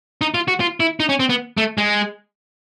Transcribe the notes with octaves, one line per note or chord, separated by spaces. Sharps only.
D#4
F4
F#4
F4
E4
D#4
C#4
C4
B3
A3
G#3